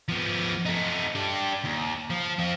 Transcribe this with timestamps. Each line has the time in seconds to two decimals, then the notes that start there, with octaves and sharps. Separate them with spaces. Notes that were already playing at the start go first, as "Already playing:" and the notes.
0.09 F3 B3
0.66 A3 D#4
1.15 D4 G4
1.64 D#2
2.10 F3
2.39 C4 F4